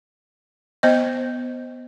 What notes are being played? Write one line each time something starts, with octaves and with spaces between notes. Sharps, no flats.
B3 C5 D#5